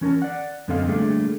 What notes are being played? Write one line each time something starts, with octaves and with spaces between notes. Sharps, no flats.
E3 C#4 A#4 A5
D5 F#5
F#2 D3 C4 A4 D#5 F5
D3 G3 A3 A#3 D4 G#4